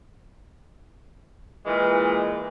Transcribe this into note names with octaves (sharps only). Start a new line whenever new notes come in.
A#2 E3 G#3